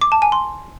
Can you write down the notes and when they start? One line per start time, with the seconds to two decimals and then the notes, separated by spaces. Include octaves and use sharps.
0.01 D6
0.12 A5
0.22 G#5
0.32 C6